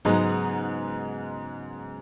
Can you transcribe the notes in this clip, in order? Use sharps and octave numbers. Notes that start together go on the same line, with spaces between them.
G#2 C#3 F#3 G#3 B3 D#4